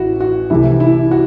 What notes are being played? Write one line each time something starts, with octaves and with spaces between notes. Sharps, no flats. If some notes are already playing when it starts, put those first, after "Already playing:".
Already playing: A1 E4 F#4
F#4
C2 C3 E3 A3 E4
E4
F#4